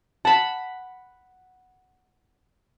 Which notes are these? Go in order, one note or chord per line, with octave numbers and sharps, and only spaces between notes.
F#5 A5 B5